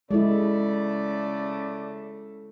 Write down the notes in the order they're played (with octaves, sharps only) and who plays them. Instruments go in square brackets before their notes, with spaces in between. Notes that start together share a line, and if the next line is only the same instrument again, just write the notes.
[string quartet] C#3 A3 [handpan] G#3 E4 [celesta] A4 [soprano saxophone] D5